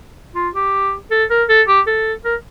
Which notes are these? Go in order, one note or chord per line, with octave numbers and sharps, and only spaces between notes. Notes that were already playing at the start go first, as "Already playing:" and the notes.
F4
G4
A4
A#4
A4
G4
A4
A#4